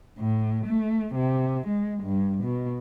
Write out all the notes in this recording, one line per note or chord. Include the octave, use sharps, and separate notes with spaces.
A2
A3
C3
G#3
G2
B2